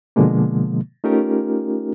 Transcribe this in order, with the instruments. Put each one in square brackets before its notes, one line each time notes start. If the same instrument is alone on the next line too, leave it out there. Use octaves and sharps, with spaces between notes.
[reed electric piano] B2 D3 F3 G#3 A#3
A3 C#4 D#4 F4 G4 A#4